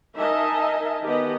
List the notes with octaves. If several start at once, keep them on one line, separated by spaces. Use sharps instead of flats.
D#4 A#4 D#5 E5 G#5 A5
D#3 B3 G4 B4 D#5